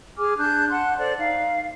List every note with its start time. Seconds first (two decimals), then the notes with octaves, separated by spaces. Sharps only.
0.18 G#4 G#5 D6 F6
0.37 D4 A5 F#6 G6
0.70 F#5 A5 C6 F#6
0.97 A4 C5 D5
1.18 D#4 F5